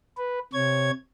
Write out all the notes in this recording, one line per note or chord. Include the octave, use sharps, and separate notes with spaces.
B4
C3 C#5 G#6